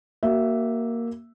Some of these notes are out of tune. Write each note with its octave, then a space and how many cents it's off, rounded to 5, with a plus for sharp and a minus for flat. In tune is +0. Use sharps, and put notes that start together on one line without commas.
A#3 +0 F#4 +30 E5 +0